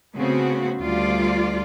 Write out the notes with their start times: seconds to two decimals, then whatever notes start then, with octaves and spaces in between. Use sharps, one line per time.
0.15 C#3 A3 B3 C4 F#4
0.81 D2 G3 F4 D5